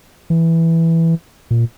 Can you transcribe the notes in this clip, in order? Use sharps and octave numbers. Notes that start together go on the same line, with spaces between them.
E3
A#2